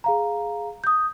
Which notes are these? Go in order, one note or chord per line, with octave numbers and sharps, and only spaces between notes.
G#4 F5 A#5
D#6 G6